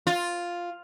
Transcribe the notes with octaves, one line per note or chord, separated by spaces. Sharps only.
F4